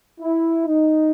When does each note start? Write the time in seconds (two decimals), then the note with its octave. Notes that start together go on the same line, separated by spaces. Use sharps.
0.20 E4
0.66 D#4